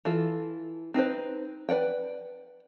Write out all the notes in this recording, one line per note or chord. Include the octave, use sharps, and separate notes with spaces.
E3 F4 A4
C4 D#4 B4 C5
B4 D5 F#5 G5